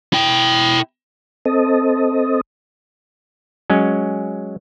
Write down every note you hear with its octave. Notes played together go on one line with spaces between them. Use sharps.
E4 G5
C4 A4 D#5
F#3 G#3 C#4